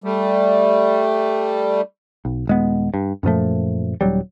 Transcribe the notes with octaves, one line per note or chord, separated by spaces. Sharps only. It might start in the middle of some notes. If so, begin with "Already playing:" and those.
G3 A3
B1
D#1 G#3 B3
G2
F#2 A#2 F3 A3
D#1 F#3 G3